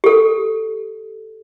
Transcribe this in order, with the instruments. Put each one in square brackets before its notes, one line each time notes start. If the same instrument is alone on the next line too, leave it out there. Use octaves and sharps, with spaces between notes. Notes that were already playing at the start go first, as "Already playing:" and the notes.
[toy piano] G4 A4